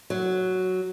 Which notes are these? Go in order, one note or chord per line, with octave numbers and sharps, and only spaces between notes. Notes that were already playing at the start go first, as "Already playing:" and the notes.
F#3